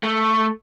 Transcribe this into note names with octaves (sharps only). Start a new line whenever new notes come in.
A3